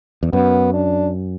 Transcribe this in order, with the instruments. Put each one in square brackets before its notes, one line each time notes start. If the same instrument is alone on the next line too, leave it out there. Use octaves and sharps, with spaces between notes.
[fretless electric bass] E2
[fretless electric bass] F#2 [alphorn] B3
[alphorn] D4